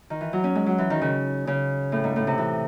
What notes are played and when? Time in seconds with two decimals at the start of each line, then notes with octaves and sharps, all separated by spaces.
0.10 D#3
0.21 E3
0.33 F#3
0.44 C#4
0.55 G#3
0.66 F#3
0.78 E3
0.90 D#3
1.01 C#3
1.47 C#3
1.92 A2
2.04 G#2
2.16 A2
2.27 C3
2.38 E3